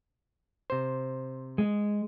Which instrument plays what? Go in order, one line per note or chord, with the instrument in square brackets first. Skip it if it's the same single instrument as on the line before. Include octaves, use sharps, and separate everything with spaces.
[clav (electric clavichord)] C3 C5
[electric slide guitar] G#3